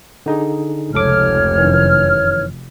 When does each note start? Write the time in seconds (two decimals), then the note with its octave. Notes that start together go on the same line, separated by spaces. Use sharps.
0.26 D3 D#4 G#4
0.94 F1 C#2 A4 C#5 D6 F6
1.58 F#2 D#3 E3